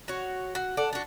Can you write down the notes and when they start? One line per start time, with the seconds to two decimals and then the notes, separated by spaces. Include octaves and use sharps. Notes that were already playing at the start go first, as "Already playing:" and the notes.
0.08 F#4 C#5
0.55 F#4
0.77 A4 D5 F#5
0.93 D4 F#4